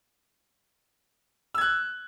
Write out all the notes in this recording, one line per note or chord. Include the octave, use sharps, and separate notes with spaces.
E6 F#6 G#6